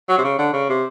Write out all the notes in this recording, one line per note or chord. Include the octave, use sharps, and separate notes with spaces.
F#3
C3
C#3
D3
C#3
C3